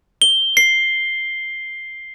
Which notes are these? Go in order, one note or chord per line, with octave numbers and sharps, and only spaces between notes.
G7
C7